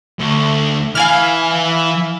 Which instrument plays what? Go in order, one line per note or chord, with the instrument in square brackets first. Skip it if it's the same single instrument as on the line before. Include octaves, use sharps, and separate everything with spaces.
[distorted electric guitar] D2
[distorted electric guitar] E3 E4 [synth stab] F5 G#5 F6